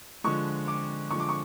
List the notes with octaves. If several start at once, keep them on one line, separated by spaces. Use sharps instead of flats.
D3 F3 G#3 C#6
D6
D3 F3 G#3 C#6
D6
C#6